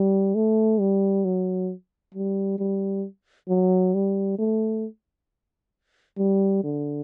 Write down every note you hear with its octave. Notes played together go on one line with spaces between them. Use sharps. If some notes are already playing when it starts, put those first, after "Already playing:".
Already playing: G3
A3
G3
F#3
G3
G3
F#3
G3
A3
G3
D3